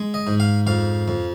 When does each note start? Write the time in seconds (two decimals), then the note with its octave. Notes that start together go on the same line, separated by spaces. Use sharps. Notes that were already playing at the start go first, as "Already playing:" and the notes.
Already playing: G#3
0.14 D#5
0.27 G#2
0.40 F5
0.67 F2 F5
1.08 F2